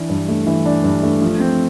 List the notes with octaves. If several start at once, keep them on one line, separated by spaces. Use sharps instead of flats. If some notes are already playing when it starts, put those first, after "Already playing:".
Already playing: E3 D4
G2
A3
E3
D4
G2
A3
F3
C4